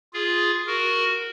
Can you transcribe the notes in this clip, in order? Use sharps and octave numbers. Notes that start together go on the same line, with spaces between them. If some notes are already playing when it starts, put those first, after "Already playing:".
F4 G#4
F#4 A#4